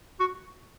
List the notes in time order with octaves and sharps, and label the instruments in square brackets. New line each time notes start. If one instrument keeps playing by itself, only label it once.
[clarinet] F#4